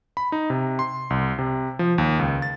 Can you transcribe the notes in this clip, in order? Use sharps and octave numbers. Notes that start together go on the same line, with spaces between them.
B5
D#4
C3
C6
C2
C3
F3
D#2
C#2
A6